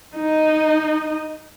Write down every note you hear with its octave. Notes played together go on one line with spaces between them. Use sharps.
D#4 D#5